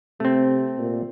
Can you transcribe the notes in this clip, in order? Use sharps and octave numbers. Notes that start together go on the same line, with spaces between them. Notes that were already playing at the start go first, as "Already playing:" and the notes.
C3 A3 C4
A#2